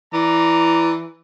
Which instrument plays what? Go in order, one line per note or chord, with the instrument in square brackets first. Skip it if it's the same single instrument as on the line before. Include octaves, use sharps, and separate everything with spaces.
[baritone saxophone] E3 [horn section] D5 A#5